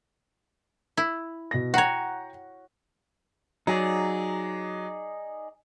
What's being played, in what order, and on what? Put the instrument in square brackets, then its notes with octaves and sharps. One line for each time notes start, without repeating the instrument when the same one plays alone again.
[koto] E4
[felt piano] B2 A#6
[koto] F#4 C#5 [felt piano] F#5 G5 A#5
[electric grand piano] F#3 [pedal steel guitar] D#4 G#4 D5